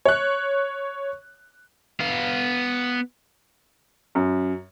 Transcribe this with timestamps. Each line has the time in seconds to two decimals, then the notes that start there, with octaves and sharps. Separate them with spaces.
0.05 C#5 F#6
2.00 B3 F5
4.15 F#2